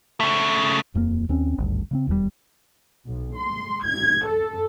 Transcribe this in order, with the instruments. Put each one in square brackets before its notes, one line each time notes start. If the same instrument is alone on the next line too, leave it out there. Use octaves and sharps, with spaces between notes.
[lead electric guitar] C#3 A3
[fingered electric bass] D#1 F2 F3 A#3
D#2 C4 C#4
G#1 D2 G2
C#3 G#3 C4
D#1 E2 G2 G3
[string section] B1
C6
G#6
A4